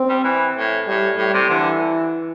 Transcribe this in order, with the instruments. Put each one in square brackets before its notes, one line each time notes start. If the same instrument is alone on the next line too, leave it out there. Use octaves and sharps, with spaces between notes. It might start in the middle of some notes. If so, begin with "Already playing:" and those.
Already playing: [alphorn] C4
[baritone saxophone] G3
E3
A2
[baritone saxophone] A2 [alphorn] G3
[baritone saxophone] A2 [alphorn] G3
[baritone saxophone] C3
[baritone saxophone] D3 [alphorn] E3